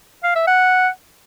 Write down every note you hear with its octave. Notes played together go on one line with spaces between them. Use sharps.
F5
E5
F#5